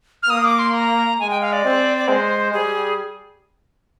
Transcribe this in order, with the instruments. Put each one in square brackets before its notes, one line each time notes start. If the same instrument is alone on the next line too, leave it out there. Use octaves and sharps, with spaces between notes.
[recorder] F6
[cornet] A#3 [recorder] D#6
[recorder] D6
C6
A#5
[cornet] G#3 [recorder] G#5
[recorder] G5
F5
D5
[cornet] C4
[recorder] D5
[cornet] G#3 [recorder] C5
[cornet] G3 [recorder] G#4